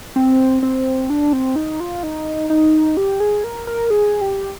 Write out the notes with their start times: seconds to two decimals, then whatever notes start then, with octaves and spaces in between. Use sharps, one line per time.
0.16 C4
0.63 C4
1.10 D4
1.33 C4
1.56 D#4
1.80 F4
2.03 D#4
2.50 D#4
2.97 G4
3.20 G#4
3.44 A#4
3.67 A#4
3.90 G#4
4.21 G4